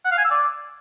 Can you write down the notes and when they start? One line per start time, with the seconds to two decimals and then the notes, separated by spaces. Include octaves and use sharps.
0.05 F#5
0.11 F5
0.18 G#5
0.24 E6
0.31 D5